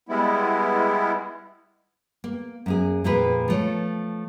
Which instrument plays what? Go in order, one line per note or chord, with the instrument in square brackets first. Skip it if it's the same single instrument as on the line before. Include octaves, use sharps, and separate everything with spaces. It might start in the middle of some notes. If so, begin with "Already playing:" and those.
[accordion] G3 G#3 B3 E4
[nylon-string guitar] A#3
F#2 A#3 G#4
F2 A#2 A#3 G#4 B4
F3 A3 C#5